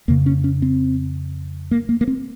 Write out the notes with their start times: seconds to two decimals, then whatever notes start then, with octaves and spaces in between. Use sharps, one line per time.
0.08 F2 C#3 A#3
0.26 C#4
0.44 C#4
0.62 C4
1.71 A#3
1.89 A#3
2.01 A#3
2.08 C4